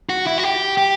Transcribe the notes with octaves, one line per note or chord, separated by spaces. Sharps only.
F#4
E4
F#4
G4
G4